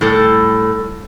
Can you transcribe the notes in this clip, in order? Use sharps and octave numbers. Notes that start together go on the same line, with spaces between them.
A2 G3 A4